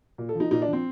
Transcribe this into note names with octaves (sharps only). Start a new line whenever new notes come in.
A#2
A4
F3 D#4
A#2 D#4
D4
F3
C4